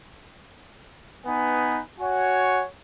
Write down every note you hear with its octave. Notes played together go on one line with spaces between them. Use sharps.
B3 D#4 B4 G#5
F#4 C#5 F#5 G#5